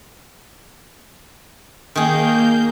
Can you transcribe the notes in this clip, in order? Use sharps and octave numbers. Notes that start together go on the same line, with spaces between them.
D#3 A#3 G#4 G6